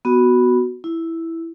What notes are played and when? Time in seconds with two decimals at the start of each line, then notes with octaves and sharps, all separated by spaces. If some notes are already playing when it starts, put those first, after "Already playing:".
0.05 B3 F#4
0.84 E4